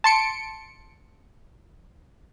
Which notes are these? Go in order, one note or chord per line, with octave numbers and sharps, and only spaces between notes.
A5 C6 C#7 D7